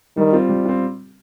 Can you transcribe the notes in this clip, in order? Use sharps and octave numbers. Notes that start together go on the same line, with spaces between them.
D#3 G3
C4 F4
G3
C4 F4